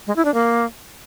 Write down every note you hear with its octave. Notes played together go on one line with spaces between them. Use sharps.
G#3
E4
D4
A#3